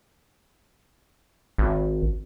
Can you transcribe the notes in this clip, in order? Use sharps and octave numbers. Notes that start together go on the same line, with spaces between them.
G#1